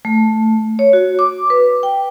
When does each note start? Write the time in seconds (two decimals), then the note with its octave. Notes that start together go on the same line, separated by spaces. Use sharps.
0.05 A3
0.79 C#5
0.93 F#4
1.19 D6
1.50 B4
1.83 G5